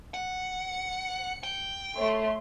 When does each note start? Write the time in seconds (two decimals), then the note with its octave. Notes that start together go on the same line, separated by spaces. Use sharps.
0.14 F#5
0.60 C#7
1.43 G5
1.98 A3 C#5 C6